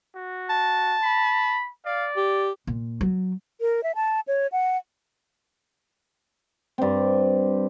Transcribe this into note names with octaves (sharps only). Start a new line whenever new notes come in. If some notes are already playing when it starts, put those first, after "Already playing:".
F#4
A5
B5
D5 F5
G4
A#2
F#3
A#4
E5
A5
C#5
F#5
G2 C4